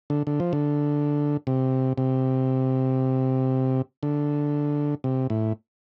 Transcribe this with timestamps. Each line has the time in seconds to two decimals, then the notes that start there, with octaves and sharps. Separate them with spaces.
0.10 D3
0.27 D3
0.40 F3
0.53 D3
1.47 C3
1.98 C3
4.03 D3
5.04 C3
5.30 A2